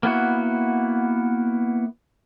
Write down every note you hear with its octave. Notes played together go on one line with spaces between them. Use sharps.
A#3 B3 E4 F#4